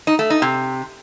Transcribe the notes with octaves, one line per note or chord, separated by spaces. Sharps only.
D#4
A3
D#4
C3